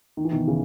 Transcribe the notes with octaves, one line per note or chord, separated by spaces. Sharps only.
D#3
E3
B2 D#3
C#3 E3